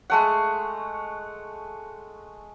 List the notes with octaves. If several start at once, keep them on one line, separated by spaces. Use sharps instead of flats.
G#3 A3 F#5